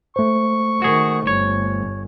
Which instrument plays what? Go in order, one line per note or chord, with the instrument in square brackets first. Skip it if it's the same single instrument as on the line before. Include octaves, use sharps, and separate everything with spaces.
[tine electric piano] A3 C5 [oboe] C#6
[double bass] D#3 [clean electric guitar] F#4 G#4
[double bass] G1 [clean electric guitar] C#5